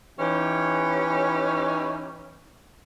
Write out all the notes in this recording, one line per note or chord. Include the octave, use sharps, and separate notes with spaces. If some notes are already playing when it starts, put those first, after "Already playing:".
E3 C#4 D#4 G4